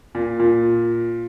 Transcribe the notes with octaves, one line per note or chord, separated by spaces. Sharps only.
A#2
A#2